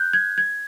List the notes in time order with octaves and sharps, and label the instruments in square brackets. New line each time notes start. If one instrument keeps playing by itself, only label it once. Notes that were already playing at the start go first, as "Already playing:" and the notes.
Already playing: [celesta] F#6 G6
G#6
G#6